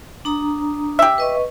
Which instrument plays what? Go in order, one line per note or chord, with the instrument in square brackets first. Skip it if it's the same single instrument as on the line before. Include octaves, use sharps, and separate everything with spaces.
[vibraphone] D4 A#5 D#6
[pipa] G4 E5
[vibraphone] B4 D#5 C#6